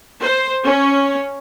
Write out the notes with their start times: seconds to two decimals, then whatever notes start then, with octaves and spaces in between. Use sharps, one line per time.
0.22 C5
0.66 C#4